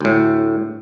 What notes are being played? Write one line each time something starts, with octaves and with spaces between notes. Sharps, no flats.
D2 A2